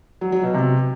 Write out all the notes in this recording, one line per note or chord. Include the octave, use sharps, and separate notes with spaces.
F#3
F#3
B2
C3